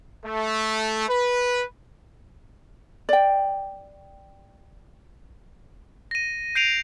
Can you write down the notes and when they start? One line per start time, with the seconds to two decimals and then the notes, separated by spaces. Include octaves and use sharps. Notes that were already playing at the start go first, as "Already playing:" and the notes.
0.26 A3
1.08 B4
3.09 D5 G5
6.11 A#6 D#7
6.55 G6 C7 D7 D#7 F7